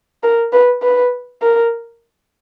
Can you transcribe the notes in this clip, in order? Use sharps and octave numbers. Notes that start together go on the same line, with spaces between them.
A#4
B4
B4
A#4